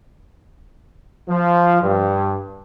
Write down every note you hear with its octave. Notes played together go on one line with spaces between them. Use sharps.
F3
G2